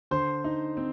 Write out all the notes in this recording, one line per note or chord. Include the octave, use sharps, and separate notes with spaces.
D3 C5 C6
D#4
C4